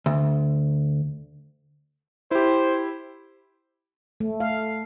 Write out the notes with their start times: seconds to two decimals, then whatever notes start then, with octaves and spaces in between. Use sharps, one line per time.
0.06 D2
2.31 E4 G4 C5
4.20 A3
4.40 F5